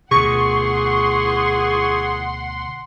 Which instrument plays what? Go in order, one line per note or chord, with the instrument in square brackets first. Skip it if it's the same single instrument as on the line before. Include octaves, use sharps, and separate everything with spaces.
[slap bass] D2 B2 [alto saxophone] G#4 [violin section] F#5 C6 [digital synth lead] C#6